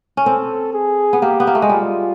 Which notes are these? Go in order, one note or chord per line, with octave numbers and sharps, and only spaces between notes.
C#4
C4 A4
G#4
B3
A#3 G4
B3
A#3
A3
G#3
G3 F4